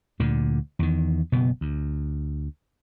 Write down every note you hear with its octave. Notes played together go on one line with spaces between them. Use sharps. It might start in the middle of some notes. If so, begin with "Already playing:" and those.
D2 A#2 D3
E2 D#3
F#1 B2 B3
D2